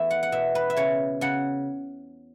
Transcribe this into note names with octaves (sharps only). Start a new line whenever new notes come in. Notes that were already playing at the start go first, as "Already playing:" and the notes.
Already playing: E2 A3 E5
F#5
F#5
B2 E5
B4
E5
C#3 C#5
C#3 F#5